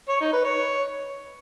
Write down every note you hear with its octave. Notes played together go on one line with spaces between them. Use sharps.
C#5
D#4
B4
C#5